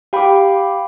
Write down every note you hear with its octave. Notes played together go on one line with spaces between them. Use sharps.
G4 F5 G5 B5 D6